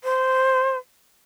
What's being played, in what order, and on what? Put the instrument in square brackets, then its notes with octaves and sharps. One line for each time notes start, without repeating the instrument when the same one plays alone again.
[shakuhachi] C5